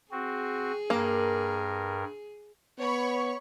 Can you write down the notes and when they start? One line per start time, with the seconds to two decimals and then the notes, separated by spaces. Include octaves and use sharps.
0.12 C4 F#4 G#4
0.90 G2 A#3 A#4
2.79 B3 C#5 B5 C#6